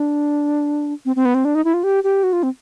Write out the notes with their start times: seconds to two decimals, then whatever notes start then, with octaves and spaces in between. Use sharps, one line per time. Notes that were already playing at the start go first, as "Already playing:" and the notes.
Already playing: D4
1.05 C4
1.16 C4
1.25 B3
1.34 C4
1.45 D4
1.55 D#4
1.65 E4
1.74 F4
1.84 G4
2.04 G4
2.23 F#4
2.33 F4
2.43 C4